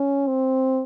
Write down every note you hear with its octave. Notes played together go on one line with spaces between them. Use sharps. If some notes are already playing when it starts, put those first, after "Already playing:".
Already playing: C#4
C4